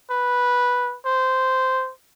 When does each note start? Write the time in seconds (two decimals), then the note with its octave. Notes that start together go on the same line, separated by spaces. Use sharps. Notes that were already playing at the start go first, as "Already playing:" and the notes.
0.11 B4
1.06 C5